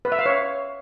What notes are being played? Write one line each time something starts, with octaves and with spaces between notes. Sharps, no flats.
B4
E5
F5
C#5